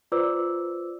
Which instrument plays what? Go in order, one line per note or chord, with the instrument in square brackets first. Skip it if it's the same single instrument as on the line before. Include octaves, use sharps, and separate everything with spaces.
[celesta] F4 B4 C5 D5 D6 E6